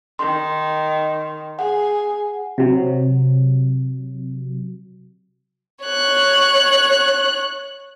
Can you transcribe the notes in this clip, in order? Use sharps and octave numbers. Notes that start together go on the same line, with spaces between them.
D#3 C6
G#4 F#5
C3 F#3
C#5 F#6